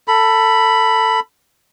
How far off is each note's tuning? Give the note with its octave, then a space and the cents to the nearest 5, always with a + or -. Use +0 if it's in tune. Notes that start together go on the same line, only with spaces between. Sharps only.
A4 +20 B5 +0